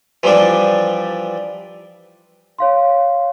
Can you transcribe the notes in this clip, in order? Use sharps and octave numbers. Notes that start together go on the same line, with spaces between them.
E3 F3 G3 D4 D5
C#5 F5 C6